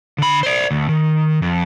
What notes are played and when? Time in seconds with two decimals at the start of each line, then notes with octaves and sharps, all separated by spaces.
0.18 D3 B5
0.43 C5 D5
0.71 D2
0.89 D#3
1.42 F2